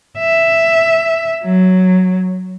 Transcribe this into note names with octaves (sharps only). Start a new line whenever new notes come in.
E5
F#3